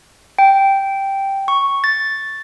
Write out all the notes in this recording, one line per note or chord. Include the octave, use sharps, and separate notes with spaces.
G5
C#6
A6